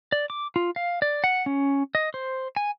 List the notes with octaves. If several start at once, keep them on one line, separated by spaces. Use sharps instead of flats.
D5
D6
F4
F5
D5
F#5
C#4
D#5
C5
G#5